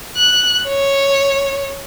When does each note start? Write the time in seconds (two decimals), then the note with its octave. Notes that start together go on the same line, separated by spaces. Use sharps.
0.16 F#6
0.68 C#5